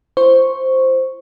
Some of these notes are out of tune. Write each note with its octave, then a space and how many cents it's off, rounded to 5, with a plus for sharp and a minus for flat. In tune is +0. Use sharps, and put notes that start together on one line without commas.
E4 +45 C5 +0 C#6 -5